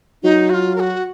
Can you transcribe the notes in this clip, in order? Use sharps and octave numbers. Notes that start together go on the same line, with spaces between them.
F#3 D#4
F#4
F4
A#4
F#4